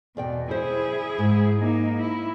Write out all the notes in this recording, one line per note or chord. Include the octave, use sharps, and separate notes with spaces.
E2 B2 D5 G5
E4 G#4 C5
G#2
A#3 D#4
E4